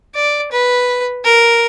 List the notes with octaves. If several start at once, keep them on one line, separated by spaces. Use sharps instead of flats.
D5
B4
A#4